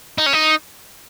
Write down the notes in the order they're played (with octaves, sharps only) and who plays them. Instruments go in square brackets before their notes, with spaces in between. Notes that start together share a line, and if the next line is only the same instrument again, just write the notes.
[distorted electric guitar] D#4
C#4
D#4